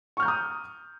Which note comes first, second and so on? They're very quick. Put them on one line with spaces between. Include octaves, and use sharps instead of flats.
C#6 F6 G6 A#5 D#6